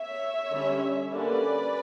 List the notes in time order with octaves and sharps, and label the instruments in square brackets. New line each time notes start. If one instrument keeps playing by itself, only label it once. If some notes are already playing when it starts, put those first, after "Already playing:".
Already playing: [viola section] C#5 E5
D3 G3 C#4
D3 G3 A#3 C#4 B4 D5